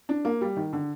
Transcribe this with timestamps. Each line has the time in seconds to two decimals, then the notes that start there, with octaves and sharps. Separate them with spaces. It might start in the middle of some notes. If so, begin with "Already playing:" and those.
0.09 D4
0.25 A#3
0.41 G3
0.57 D#3
0.73 D3